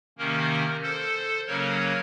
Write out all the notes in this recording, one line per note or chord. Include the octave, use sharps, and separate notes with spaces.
C3 D#3 A#3 C#4 A#4
A4 C5
C#3 F#3 A#3 C#4 A#4 C#5